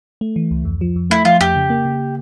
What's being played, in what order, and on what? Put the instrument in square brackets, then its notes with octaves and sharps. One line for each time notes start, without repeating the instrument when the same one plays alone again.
[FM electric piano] A3
E3
C#2
F2
F3
F2
[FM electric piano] A3 [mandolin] E4
[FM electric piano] F3 [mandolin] F4
[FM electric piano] F2 [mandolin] G4
[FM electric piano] C#3
A#3
C#3